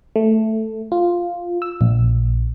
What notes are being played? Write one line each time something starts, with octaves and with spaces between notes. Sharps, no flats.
A3
F4
E6
A#1